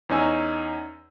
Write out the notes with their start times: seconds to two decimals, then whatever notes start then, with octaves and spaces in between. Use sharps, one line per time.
0.09 E2 C#4 D#4 G#5 E6